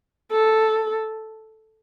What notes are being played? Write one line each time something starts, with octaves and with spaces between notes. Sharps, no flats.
A4